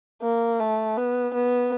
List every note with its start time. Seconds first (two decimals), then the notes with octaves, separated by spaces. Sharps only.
0.22 A#3
0.60 A3
0.97 B3
1.34 B3